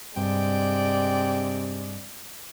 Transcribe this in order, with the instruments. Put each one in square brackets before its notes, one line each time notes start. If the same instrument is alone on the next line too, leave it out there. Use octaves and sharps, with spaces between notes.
[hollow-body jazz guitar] G2 [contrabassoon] C3 [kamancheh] G#3 D5 [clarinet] G5